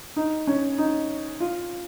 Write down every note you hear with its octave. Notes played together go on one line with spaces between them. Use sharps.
D#4
C#4
D#4
F4